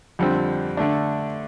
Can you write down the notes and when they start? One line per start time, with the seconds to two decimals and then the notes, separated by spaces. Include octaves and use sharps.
0.19 F2 D3 G3 C4
0.77 D3 A3 D4